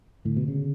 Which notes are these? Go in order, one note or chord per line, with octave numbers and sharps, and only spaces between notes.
A2 D3
B2
C#3